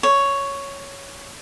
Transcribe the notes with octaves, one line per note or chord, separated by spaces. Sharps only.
C#5